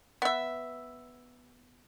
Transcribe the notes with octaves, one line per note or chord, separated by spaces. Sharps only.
B3 E5